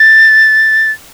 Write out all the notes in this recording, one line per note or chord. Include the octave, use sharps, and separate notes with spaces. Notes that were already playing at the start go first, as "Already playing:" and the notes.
Already playing: A6